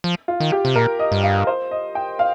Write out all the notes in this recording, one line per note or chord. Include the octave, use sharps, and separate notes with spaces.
F3
F4
D#3
G4
C3
A#2 A#4
D#5
G2
F5
C5
D#5
G5
F5